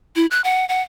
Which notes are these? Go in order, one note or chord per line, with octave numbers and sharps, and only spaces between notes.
E4
F#6
F#5
F#5